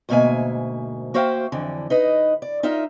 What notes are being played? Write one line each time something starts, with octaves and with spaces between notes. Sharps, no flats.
D2 G#2 B2 A#3 E5 G#5
A#3 F#4 C5 E5 F5 G5
F2 D3 E3
D#4 B4 D#5
D5
D#4 F4 A#4 E5